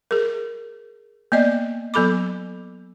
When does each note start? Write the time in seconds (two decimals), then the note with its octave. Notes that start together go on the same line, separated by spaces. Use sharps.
0.11 G#4 A#4
1.32 A#3 B3 D5 D#5
1.94 F#3 B3 A4 B5 D6